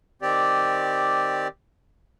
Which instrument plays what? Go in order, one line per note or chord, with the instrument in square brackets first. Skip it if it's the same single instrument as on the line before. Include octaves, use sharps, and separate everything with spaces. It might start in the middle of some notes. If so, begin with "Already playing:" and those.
[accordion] D#3 C4 G4 D5